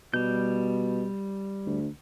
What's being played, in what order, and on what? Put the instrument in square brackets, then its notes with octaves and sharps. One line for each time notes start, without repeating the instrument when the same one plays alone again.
[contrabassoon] B2 [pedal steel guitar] G3 G6
[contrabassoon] D2